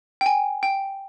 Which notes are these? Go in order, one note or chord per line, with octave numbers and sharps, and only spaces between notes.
G5
G#5
G5